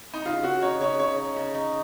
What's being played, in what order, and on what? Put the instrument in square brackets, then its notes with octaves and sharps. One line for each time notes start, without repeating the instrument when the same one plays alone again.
[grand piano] D#4
[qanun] C#3 [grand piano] F4
[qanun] C#3 [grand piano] F#4
[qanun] D#4 [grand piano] C#5
[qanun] C#3 [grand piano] C#5
[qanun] C#3 [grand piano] C#5
[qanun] D#4
C#3
D#4